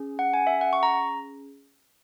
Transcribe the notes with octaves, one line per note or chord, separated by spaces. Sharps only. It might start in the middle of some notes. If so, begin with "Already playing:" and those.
Already playing: C#4 G#4
F#5
G#5
E5
F#5
C#6
A#5